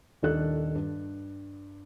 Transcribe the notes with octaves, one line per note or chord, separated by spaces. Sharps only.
D#1 D#3 D4 A4 F#6
G2